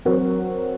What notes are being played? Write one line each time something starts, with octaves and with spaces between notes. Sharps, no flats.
F#3 C4 F#4 A#4